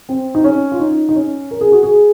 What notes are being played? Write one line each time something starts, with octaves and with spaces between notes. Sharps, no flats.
C4
D#4
C#4
F4
D#4
D#4
C#4
A#4
G#4
F#4
G#4